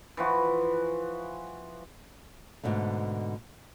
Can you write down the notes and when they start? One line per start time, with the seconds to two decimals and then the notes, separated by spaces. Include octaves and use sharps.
0.17 E3 F3 F#4
2.63 G#2 B2 D3 A3